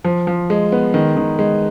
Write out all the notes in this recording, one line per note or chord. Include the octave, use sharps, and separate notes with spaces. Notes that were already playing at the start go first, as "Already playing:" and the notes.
F3
F3
G#3
B3
D#3
D#3
G#3